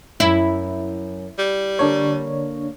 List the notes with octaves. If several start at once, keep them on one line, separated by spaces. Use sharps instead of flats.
F#2 E4
G3
D3 A#3 D4 A4 A#4 C#5